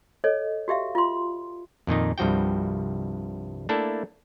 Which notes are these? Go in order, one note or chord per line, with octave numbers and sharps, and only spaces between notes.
A4 C#5 D#5
F#4 G4 E5 F5
F4 C6
F2 A#2 D#3 D#4
C2 G2 F3 F#4 G5
A3 A#3 D4 E4 A4